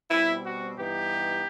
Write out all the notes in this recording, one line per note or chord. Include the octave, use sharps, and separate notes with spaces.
B2 G3 C4 E4
F#4
G2 E3 B3 D#4 G4